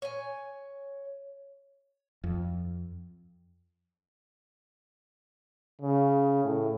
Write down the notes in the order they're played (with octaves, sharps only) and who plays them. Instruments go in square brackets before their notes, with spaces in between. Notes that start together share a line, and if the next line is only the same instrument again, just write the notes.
[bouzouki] C#5 G#5
[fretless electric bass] F2
[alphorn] C#3
A2